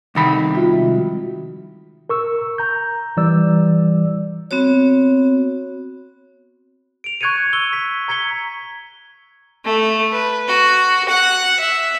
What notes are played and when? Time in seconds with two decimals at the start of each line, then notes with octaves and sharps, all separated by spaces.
0.15 C2 D#3 B5
0.54 F4 F#4 E5
0.74 C3 F3 G#3
2.09 A#4 C#6 E6
2.58 A#5 G6
3.17 E3 G3 D5 E6
4.51 B3 C4 F#4 C#5
7.04 D7 F7
7.21 C#6 F#6 G#6 A6 C#7 D#7
7.53 C#6 E6 G7
7.73 B6
8.08 A#5 G#6 B6 C#7 G7
9.65 A3
10.12 B4
10.47 F#4
11.09 F#5
11.59 E5